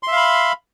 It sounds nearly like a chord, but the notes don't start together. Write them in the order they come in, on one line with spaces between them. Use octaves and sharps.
C6 E5 F5 B5